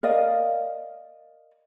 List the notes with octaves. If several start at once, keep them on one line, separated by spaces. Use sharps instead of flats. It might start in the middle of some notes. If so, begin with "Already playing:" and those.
A#4 D5 D#5 F5